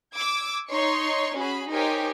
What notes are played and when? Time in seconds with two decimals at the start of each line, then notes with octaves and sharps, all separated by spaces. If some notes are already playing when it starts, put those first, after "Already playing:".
0.14 D6 E6 G#6
0.70 D#4 C#5 C6 C#6
1.37 C#4 F#4 G#4 B5
1.71 D#4 G4 A#4 C5 C#5 G#5